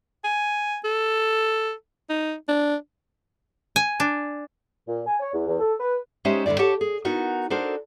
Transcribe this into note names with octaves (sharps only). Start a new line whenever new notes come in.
G#5
A4
D#4
D4
G#5
D4
A#2
G#5
C#5
E2
E2
A4
B4
G#3 C#4 D#4 G4 C5 E5
D2 G2 D3 F3 D5
G4 A4 C#5 F#5 A5
G#4
B3 D#4 F#4 A#4
D4 D#4 F#4 A4 A#4 C5